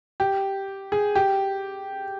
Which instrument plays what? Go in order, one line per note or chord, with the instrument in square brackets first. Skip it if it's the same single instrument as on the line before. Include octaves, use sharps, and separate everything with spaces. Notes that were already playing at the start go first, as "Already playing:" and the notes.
[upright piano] G4
G#4
G4